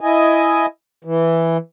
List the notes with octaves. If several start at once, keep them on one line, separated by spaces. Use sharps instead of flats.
E4 D#5 G#5
E3